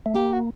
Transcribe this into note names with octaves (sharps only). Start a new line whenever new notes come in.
A3
A#3 G4
F#4